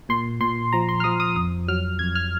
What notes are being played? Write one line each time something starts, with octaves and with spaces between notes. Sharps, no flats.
A#2 C6
A#2 C6
F3 A#5
C6
F6
F3 D#6
D#6
F2 D#6
F#3 F6
F2 G#6
F6